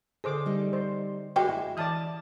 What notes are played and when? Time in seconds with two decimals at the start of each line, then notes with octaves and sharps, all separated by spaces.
0.24 D3 G#4 A4 C5 D6
0.46 G3 D#4
0.73 C5
1.36 G3 G#3 F#4 G5 G#5
1.49 E4
1.77 E3 D5 A5 D#6 F6